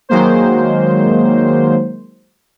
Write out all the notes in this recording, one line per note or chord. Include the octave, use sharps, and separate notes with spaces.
D#3 F#3 G#3 A#3 C5